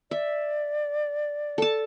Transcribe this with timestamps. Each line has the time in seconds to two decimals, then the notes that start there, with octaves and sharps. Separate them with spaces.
0.11 D5 E5
1.58 A4 A5